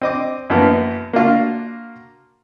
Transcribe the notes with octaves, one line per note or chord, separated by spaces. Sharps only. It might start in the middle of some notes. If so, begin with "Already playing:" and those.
C4 D#5 D6
F#2 E3 F3 A#3 B3
A#3 D4 F4 F#4